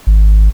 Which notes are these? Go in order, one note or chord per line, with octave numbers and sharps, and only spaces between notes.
G#1